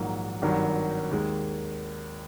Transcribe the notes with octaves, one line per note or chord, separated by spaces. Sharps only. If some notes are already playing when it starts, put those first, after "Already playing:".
Already playing: A#1 G#2 D#3 F#3 A#3
G#1 G2 D#3 F#3
D#2 D#3 G#3